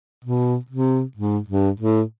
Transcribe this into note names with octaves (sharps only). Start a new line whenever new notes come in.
B2
C3
G#2
G2
A2